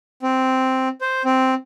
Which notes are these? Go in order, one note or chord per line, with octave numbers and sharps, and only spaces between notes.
C4
C5
C4